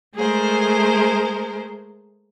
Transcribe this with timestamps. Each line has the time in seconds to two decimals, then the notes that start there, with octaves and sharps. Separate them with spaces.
0.15 G#3 A3 G#4 A#4 C5